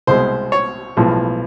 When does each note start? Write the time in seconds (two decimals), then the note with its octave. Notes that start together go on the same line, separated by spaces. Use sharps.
0.07 C2 B2 G#3 C5
0.52 C#5
0.97 B1 A2 F3 G#3